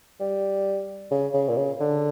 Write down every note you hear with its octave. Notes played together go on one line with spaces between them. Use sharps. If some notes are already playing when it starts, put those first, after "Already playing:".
G3
C#3
C#3
A#2
C#3
D3